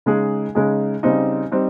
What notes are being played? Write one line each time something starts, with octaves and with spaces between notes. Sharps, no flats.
C#3 G#3 D#4 G#4
C#3 G#3 D#4 G#4
C#3 G3 C4 D#4
G3 C4 D#4